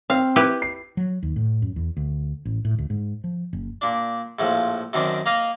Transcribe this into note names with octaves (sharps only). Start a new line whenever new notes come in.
C4 F5
E4 G4 B4
C7
F#3
D#2
A2
F#2
E2
D2
A1
A2
D2
G#2
F3
F#1
A#2 D4
A#1 A2 F3
F#2 D#3 C4 D4
A#3 A#4 D#5 F5